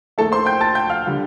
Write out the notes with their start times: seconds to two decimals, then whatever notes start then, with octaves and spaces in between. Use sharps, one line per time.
0.18 D#2 D#3 A3 A4 A5
0.32 C5 C6
0.46 G5 G6
0.61 A5 A6
0.75 G5 G6
0.90 F5 F6
1.07 D3 G3